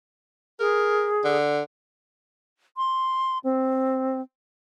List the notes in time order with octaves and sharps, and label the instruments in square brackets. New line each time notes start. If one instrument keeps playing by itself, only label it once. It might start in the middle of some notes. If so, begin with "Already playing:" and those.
[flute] G#4 [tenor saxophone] A#4
[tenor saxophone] D3
[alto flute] C6
C4